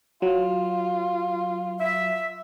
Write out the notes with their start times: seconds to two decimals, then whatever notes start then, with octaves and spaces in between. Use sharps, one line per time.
0.22 F#3 F4
1.80 E5